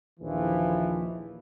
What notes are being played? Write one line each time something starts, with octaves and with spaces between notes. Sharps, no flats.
A#1 D#2 E3 F3